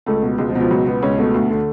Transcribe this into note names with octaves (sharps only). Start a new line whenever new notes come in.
C#2 A3
B2
C#2 G#3
F3
B2
F3
C#2 F#3
B2 B3
C#2 C#4
B2 A3
D2
D3